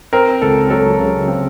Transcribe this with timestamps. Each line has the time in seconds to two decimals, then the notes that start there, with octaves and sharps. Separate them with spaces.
0.13 C4 A#4
0.42 C#2 A4
0.70 F#3 A4
1.00 C#3
1.28 C4